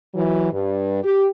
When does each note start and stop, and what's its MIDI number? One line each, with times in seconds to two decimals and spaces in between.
0.14 0.49 52
0.14 0.49 54
0.52 0.99 43
1.03 1.27 67